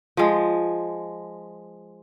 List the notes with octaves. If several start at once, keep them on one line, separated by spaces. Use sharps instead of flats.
F3 G#3